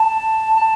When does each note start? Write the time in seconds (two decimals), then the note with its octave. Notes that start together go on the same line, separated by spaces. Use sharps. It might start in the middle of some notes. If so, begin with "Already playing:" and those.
Already playing: A5
0.57 A5